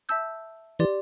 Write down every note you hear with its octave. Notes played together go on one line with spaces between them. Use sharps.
E5 A5 E6 G6
E3 G4 D5 C6